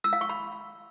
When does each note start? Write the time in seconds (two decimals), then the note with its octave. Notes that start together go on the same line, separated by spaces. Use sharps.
0.04 E6
0.13 F5
0.21 C#6
0.29 B5